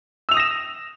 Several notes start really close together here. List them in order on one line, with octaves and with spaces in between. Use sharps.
E6 F7 D#6 A#6 E7